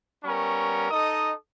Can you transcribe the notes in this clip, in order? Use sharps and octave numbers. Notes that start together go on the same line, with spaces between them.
G3 B3 C#4 A#4 C#6
D#4 A4 D#5 D#6